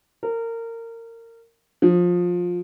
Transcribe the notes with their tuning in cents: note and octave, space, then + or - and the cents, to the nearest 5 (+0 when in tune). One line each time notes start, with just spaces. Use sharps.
A#4 -25
F3 +20